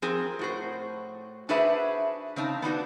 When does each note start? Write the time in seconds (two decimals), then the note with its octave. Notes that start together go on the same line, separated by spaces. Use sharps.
0.02 F3 C4 G#4 A#4
0.39 A2 F#4 C5
1.49 D4 F#4 G#4 B4 C5 E5
2.36 C#3 C4 D#4 A5
2.62 B3 D4 D#4 F#4